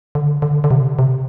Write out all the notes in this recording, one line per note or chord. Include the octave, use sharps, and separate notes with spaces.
D3
D3
D3
C3
C3